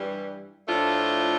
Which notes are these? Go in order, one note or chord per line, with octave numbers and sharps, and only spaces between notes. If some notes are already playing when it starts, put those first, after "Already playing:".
Already playing: G2 E3 G3
A2 F3 A3 D4 F4